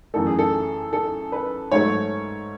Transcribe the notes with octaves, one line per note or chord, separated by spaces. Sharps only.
F#2 E3 A3 A4
G#4
A4
A4
B4
G#2 F#3 A3 C#5